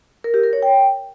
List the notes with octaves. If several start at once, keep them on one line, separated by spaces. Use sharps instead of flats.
A#4
G4
A#4
C#5
G5